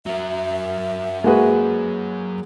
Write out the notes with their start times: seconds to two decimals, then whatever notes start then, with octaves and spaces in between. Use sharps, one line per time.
0.06 F#3 A#4 E5
1.24 G#3 A#3 F#4 G#4 B4